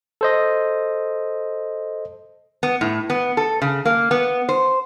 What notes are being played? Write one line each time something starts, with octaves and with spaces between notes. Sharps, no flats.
A4 C5 D#5
B3
A2
B3
A4
C#3
A#3
B3
C5